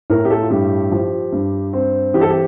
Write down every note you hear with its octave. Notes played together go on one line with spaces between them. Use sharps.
A2 A#4
G4
A4
F4
G2 G4
F3
G2
C4
E3 G4
A4
G4